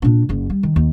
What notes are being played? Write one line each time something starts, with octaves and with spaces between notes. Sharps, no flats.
A#2 D4
F#1 F#2
G3
D#3
D#2